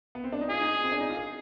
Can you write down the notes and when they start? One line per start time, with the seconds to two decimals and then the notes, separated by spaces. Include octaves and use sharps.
0.15 B3
0.24 C4
0.32 D4
0.41 D#4
0.49 F4 G#4
0.61 D#4
0.84 C4
0.92 D4
1.00 D#4
1.10 F4
1.17 G#4